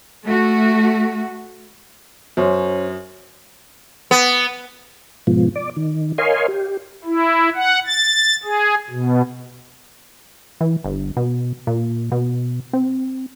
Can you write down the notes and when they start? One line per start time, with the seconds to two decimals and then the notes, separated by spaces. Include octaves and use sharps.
0.24 A3 F#4
2.37 F#2 C#4 C5
4.11 B3
5.27 G#2 B2 F3
5.56 D5
5.76 D#3
6.18 A#4 C#5 D#5 F5 G#5 C6
6.48 G4
7.05 E4
7.55 F#5
7.86 A6
8.43 G#4
8.90 B2
10.61 E3
10.84 G1
11.17 B2
11.67 A#2
12.12 B2
12.73 C4